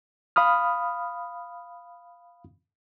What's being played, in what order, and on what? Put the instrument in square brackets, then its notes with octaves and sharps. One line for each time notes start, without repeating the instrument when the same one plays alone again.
[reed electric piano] F5 B5 D#6 F6